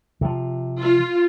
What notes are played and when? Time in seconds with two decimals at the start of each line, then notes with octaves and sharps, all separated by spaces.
0.21 C3 F3
0.81 F4